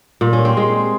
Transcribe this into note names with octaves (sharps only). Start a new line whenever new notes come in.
A#2
C#4
C4
G#3